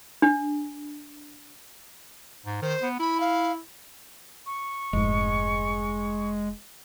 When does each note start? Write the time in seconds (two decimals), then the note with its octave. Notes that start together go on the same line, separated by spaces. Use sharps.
0.22 D4
2.46 G#2
2.62 D#3 C5
2.82 B3
3.00 E4 B5
3.20 F5
4.46 C#6
4.93 F1 G#2 G#3